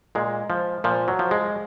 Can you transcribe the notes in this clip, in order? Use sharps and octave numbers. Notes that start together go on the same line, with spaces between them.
A#2 G#3
F3
A#2 F3
F#3
F3
G#3